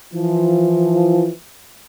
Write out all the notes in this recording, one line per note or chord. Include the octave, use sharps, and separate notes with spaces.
E3 F3